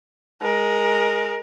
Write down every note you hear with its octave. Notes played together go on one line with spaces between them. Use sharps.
G#3 A#4